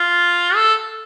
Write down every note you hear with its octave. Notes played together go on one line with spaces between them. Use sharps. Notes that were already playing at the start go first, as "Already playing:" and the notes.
Already playing: F4
A4